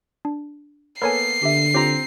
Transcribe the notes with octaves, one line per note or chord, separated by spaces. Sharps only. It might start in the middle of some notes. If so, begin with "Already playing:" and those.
D4
A#3 B3 A4 A#4 C#5 G#5 C7
D3 G4 E5
C4 F4 G4 A#5